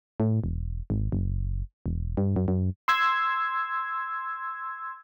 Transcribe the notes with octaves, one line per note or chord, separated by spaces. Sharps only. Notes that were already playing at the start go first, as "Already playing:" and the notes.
A2
E1
G#1
F#1
E1
G2
F#2
F#2
C6 E6 G#6